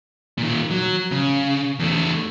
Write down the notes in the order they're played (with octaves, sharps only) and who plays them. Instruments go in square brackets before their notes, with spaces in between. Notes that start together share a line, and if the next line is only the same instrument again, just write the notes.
[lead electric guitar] A#2 D#3
F#3
C#3
E2 A3